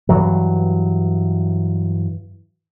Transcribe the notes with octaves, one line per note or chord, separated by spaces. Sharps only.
G2 E3 F#3